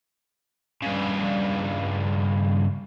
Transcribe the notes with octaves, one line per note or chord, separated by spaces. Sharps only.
G2 C#3